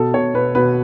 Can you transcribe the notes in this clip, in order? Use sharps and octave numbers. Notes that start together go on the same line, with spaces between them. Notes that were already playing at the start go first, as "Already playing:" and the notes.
Already playing: B2 A4
B2 C#5
B2 B4
B2 B4